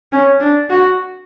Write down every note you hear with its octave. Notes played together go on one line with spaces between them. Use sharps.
C#4
D4
F#4